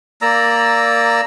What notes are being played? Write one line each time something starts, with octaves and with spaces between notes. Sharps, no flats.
A#3 D5 A#5 E6